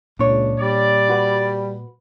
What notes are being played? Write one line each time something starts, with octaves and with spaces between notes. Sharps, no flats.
C#2 A#2 D4 C#5
G3 D5
F#4 B4